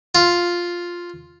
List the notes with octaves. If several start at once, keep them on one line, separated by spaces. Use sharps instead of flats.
F4